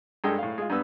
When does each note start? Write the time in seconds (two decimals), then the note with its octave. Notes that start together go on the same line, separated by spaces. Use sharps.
0.24 G2 G#3 A4 G5
0.39 A2 F5
0.58 G#3 F4
0.70 G2 B3 E6